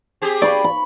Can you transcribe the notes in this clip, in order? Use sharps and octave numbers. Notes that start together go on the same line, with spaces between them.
C4 G4 G#4
D5 B5 C#6
B5